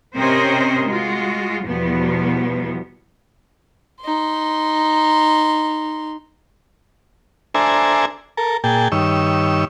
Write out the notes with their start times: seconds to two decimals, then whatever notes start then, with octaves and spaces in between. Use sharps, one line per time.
0.16 C3 C4 C#4 A#4 C5 D#5
0.87 G#3 F4 F#4
1.66 E2 B2 F3 G3 B3
4.02 D#4 C6
7.54 D4 A4 C5 E5 G#5 A#5
8.37 A4 A#4
8.64 A#2 G#4 G5 A5
8.92 G2 D#3 C#5 E6